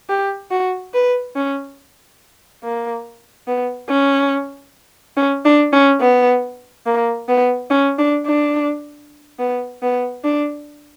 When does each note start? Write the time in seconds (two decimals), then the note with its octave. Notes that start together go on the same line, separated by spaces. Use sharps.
0.09 G4
0.51 F#4
0.94 B4
1.36 C#4
2.63 A#3
3.47 B3
3.89 C#4
5.17 C#4
5.45 D4
5.73 C#4
6.01 B3
6.86 A#3
7.29 B3
7.70 C#4
7.98 D4
8.26 D4
9.39 B3
9.83 B3
10.24 D4